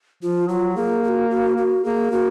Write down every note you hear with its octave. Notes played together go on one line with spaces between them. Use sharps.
F3 F4
F#3 F4
A#3 G#4
G#4
F#4
F#4
F#4
A#3 G#4
A#3 F#4